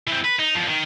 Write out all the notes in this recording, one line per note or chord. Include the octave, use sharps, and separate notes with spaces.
E3 C4
B4
D#4
E2 F3
D#3